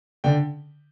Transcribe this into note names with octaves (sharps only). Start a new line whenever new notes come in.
D3 D5 G5